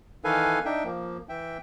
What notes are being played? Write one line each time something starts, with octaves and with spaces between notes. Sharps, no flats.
D#3 E3 A4 B4 F5 G#5
D4 D#4 E5 G5
F3 A#3
E3 E5 G5